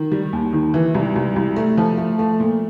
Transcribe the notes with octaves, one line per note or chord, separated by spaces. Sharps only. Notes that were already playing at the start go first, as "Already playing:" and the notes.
Already playing: D#3
G3
D#2
D#3
E3
C2
C2
C2
A3
F3
A3
A3
A#2